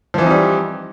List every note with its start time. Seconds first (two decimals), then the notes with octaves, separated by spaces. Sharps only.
0.14 F3
0.18 E3
0.22 C4
0.26 D#4
0.30 G3